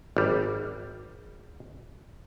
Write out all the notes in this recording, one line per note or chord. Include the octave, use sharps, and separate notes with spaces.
G#1 G3